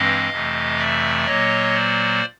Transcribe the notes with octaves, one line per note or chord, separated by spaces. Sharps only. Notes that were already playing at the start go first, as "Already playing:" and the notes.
Already playing: G2 E3 G#3 C4 D#5 F5
F2 C3 E3 A3
D5 E5
A#2 F#3 A#3 C#5 D#5
C5 D5